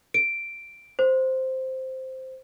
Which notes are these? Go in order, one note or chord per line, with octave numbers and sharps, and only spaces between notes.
D7
C5